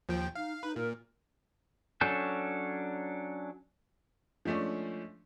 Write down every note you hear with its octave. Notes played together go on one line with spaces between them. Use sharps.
D#2 F3 G5
D#4 F5
D#4 B4
A#2 A#4
F#3 C#4 D4 A4 G6
F3 G#3 A3 C#4 D4